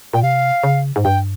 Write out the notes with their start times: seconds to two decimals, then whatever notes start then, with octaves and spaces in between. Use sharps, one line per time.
0.13 A#2 G5
0.23 C3 F5
0.63 C#3
0.96 G#2
1.04 G2 G5